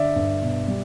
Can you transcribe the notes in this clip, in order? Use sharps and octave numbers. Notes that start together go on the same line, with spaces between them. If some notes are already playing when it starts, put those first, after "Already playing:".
Already playing: D3 D5 E5
G2
B2
G3